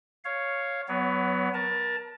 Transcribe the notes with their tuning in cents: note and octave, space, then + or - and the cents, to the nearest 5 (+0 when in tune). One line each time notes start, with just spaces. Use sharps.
C#5 +0 F5 +0
F#3 +5 B3 +15 C#5 +35
A#4 +30 A5 +5